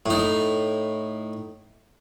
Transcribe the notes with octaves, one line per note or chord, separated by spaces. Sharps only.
A2 D#4